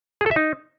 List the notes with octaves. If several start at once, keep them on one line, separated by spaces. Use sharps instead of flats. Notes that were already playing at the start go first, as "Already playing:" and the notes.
G#4
A4
E5
D#4